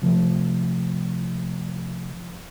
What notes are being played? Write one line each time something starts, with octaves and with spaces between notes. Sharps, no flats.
C3 F3 A3